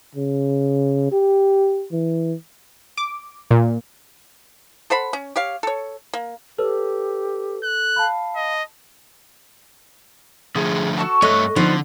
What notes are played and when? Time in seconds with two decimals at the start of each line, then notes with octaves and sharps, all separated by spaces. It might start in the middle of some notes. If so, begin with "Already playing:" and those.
0.15 C#3
1.12 G4
1.92 E3
2.98 D6
3.51 A#2
4.90 A4 C5 F#5 B5
5.13 C#4
5.36 G4 C#5 F5
5.63 A4 C#5
6.13 A#3
6.58 G4 A4 B4 C#5 E6
7.63 F#6
7.96 F5 A5 B5
8.36 D#5
10.55 D3 F3 A3 G#4
10.98 F#4 A4 C#6
11.22 G2 A3 C#5 D#5 C#6 F#6
11.56 D3 F3 B3 D#4